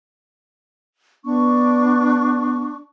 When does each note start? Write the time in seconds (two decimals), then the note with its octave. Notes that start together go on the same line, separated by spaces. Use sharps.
1.25 B3 D4 C#6